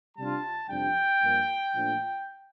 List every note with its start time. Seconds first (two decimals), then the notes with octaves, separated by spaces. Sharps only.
0.17 C3 G3 D4 F4 A5
0.69 F2 C3 G3 D4 G5
1.21 G2 F3 A#3
1.73 A#2 F3 A3 D4